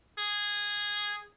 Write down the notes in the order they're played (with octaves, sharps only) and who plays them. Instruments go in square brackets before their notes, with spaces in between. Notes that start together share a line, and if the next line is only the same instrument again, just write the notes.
[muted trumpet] G#4